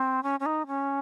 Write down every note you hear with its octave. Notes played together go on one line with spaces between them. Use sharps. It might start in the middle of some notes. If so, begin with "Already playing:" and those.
Already playing: C4
C#4
C#4
D#4
C#4